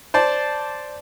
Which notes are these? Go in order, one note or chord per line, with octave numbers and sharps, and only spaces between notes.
C5 D5 A5